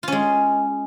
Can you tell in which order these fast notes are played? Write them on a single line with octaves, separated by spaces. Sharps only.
F4 C#4 G#3